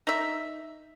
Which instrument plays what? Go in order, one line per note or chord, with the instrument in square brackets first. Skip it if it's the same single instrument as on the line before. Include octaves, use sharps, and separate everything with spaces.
[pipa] D#4 E5